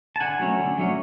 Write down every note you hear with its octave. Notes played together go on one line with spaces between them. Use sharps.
A5
D3 F#5 G#5
F#3 A3 C#4
D3
F#3 A3 C#4